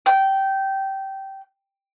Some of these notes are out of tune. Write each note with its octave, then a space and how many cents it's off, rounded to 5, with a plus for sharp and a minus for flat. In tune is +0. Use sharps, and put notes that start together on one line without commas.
G5 -15